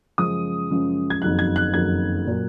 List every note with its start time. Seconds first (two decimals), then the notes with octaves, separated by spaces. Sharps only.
0.18 F#2 C#3 F3 G#3 D#6
0.70 F#2 C#3 F3 G#3
1.10 G#6
1.22 F#1 F2 D#3 F#3 F#6
1.39 G#6
1.56 F#6
1.73 F#1 F2 D#3 F#3 G#6
2.26 A#2 F#3 A#3